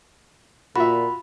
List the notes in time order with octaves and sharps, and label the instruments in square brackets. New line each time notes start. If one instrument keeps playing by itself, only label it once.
[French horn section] A#2 [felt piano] F4 [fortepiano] F#4 E5 [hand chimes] B5